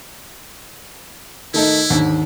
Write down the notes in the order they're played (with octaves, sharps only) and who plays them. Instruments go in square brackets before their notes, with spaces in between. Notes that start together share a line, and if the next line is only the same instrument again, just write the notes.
[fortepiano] D#3 A3 D#4 [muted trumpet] E4
[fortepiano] D#2 G#2 D3